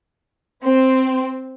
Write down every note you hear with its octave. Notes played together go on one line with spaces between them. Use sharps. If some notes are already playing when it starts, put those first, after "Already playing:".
C4